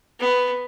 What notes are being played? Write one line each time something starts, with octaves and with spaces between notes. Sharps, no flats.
B3